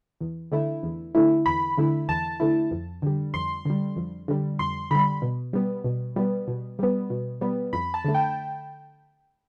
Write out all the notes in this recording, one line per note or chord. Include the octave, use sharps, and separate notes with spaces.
E2
D3 A3 E4
E2
D3 A3 E4
E2 B5
D3 A3 E4
E2 A5
D3 A3 E4
F2
D3 G3
F2 C6
D3 G3
F2
D3 G3
F2 C6
D3 G3 B5
B2
G3 B3
B2
G3 B3
B2
G3 B3
B2
G3 B3
F2 B5
A5
D3 A3
G5